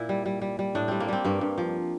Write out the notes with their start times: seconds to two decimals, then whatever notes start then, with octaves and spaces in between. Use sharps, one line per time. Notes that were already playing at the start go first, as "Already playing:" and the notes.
Already playing: A#2 E4
0.09 G3
0.26 G3
0.41 G3
0.59 G3
0.75 A2 D4
0.88 G3 C4
1.00 A#3
1.08 G3 C4
1.25 G2 A#3
1.41 G2
1.58 F3